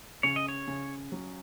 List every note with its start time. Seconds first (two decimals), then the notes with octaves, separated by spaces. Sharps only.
0.23 C#3 C#5
0.36 D#5
0.48 C#5
0.67 C#3
1.12 F#3